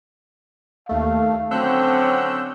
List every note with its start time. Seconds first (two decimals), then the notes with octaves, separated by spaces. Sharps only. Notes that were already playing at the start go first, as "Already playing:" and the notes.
0.89 D#2 A3 F5
1.51 D3 F#3 C4 C#4 E6 F#6 G6